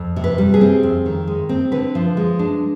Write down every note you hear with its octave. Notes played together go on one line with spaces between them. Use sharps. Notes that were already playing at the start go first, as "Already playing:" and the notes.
Already playing: F2
C3
B4
G3
G#4
C4
F2
D#3
G#3
C4
D3 B4
F3
G#3
D4